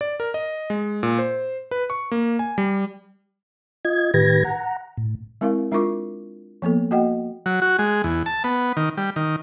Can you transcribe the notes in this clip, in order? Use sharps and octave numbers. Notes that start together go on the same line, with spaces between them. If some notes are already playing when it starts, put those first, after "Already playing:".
D5
A#4
D#5
G#3
A#2
C5
B4
C#6
A#3
G#5
G3
F4 D#5 G#6
A2 D#3 G4 B4 G#6 A#6
F#5 A#5
A2
G#3 C4 E4 A#4 F5
G#3 D4 F4 A#4 C#6 D6
F3 A#3 B3 A4
A#3 F#4 D#5 F#5 G5
F#3
F#4
G#3
E2
A5
B3
D#3
G3
D#3